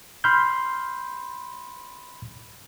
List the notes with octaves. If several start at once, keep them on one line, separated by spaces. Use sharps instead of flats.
B5 C6 F6 G6